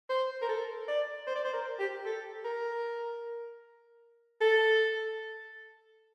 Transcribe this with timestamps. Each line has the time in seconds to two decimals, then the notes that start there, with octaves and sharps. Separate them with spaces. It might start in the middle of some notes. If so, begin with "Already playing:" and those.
0.10 C5
0.42 A#4
0.49 A4
0.88 D5
1.27 C5
1.36 D5
1.44 C5
1.53 A#4
1.79 G4
2.05 A4
2.45 A#4
4.41 A4